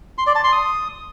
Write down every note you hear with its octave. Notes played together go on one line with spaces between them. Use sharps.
C6
D5
A5
C6
D#6